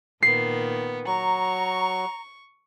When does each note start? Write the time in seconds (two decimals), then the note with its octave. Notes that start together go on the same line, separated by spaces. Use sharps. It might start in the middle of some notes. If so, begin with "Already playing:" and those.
0.23 A#2 D#3 B3 C7
1.06 F#3 A#5 C#6